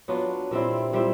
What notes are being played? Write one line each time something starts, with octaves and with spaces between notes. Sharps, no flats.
F#3 B3 D4 F4
A#2 G3 C4 E4
A#2 G3 C4 E4